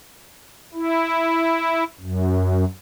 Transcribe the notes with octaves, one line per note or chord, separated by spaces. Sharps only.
E4
F#2